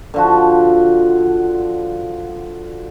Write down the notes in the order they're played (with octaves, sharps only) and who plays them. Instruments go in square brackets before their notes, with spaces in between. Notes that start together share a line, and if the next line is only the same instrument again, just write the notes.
[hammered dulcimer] D3 F3 F#4